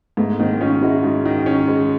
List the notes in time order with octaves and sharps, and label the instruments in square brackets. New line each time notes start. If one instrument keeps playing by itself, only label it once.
[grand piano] G#2 [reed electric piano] A3 B3
[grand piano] D#3 [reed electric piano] A#3 C4
[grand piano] C#4 [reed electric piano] D#4 F4
[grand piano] G#3 [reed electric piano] E4 F#4
[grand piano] G#2
D#3
C#4
G#3